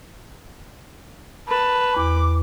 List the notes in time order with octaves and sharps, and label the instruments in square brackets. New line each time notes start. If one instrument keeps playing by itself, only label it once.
[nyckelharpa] B4 [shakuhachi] A5
[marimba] E2 [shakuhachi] D6